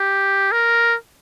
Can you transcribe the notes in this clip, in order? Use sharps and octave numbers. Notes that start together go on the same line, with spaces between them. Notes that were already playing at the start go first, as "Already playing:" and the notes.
Already playing: G4
A#4